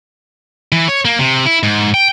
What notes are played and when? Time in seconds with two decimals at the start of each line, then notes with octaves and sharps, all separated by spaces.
0.72 E3
0.88 C#5
1.05 A#3
1.19 C3
1.46 E4
1.63 G#2
1.94 G5